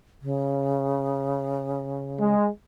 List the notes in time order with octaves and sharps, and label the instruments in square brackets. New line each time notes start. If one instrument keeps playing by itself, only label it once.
[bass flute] C#3
[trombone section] G#3